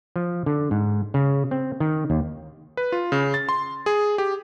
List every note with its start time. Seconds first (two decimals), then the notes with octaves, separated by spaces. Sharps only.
0.16 F3
0.46 D3
0.71 G#2
1.14 C#3
1.51 C4
1.80 D#3
2.10 D#2
2.77 B4
2.92 F4
3.12 C#3
3.34 A6
3.49 C6
3.86 G#4
4.18 G4